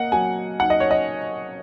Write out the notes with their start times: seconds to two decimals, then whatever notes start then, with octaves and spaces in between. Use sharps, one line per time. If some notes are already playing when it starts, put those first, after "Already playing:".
Already playing: A#3 D#5 F#5
0.12 F#3 G#5
0.60 D#4 F#5
0.70 D#5
0.80 C#5
0.91 D#5